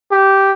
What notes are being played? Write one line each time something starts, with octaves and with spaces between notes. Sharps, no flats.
G4